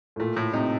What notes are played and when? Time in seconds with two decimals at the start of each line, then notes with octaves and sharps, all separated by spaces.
0.16 A2
0.20 A#2 A3
0.36 A2
0.53 C3 D#4